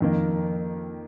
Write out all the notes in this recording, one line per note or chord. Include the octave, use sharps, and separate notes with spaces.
F2 D#3 A#3